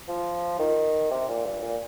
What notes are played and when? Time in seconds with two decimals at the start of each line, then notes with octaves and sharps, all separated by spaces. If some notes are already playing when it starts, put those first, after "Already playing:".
0.08 F3
0.59 D#3
1.11 C3
1.28 A#2
1.45 G2
1.62 A#2